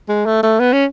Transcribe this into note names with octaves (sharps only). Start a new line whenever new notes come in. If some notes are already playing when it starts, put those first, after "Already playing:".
G#3
A3
A3
B3
C#4